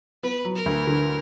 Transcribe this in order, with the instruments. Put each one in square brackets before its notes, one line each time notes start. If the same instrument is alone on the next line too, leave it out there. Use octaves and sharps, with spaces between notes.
[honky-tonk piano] B3 [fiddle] B4
[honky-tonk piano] F#3
[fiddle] A#4
[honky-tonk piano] D2
D3